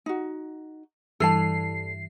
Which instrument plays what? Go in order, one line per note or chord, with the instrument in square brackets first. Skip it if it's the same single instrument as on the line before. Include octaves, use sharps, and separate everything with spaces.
[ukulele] D#4 F#4
[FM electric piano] G2 E3 C7 [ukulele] A4 D5 A5